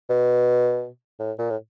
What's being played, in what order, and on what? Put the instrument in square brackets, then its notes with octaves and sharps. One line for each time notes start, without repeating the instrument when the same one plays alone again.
[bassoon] B2
A2
A#2
A2